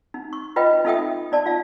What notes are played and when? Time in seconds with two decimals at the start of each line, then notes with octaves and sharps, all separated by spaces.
0.14 D#4
0.33 C#6
0.56 D#4 F4 B4 D#5 G5 B5
0.85 D#4 F4 A4 E5 G5 D#6
1.32 D#4 D5 A5
1.46 F4 F5